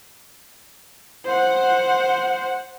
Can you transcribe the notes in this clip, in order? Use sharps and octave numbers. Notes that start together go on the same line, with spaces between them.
C5 F#5